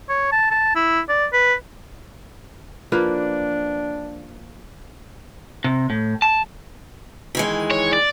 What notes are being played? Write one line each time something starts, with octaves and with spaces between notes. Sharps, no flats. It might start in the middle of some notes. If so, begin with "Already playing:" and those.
C#5
A5
A5
E4
D5
B4
F3 A#3 D4 B4
C3
A2
A5
D#3 E3 G#3
C#5
D5